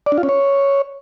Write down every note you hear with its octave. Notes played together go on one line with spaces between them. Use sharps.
D5
D4
F4
C#4
C#5